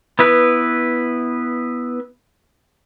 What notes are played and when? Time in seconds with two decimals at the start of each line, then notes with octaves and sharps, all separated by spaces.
0.19 B3 E4 B4